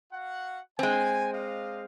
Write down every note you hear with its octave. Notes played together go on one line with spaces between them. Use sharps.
F#4 F5 F#5
G#3 C4 G#5
D4 D#5 F5